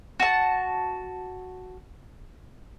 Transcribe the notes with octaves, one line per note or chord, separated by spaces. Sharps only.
F#4 A5